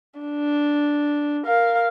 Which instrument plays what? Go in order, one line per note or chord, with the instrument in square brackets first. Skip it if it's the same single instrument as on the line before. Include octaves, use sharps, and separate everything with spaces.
[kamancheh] D4
A#4 F5